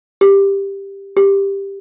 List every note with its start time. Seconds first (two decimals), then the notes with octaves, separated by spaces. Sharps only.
0.21 G4
1.17 G4